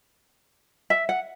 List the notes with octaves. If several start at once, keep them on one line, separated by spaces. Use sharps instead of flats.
E5
F#5